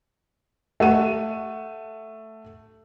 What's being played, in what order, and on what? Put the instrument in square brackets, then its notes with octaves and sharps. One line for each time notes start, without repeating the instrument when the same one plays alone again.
[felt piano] A3 F#5 D#7